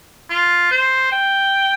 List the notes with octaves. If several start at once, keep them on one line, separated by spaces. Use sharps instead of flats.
F4
C5
G5